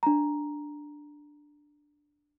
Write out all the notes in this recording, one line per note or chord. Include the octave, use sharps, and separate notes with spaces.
D4 A#5